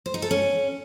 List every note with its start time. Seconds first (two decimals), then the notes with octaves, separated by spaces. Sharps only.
0.06 C5
0.14 D#4
0.22 A4
0.31 C#4